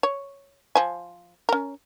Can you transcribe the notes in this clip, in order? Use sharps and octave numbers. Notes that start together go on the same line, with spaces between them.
C#5
F3 G#5
C#4 A#4